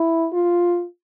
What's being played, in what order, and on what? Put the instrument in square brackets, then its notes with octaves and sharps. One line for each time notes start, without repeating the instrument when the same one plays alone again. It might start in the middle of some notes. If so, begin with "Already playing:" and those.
Already playing: [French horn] E4
F4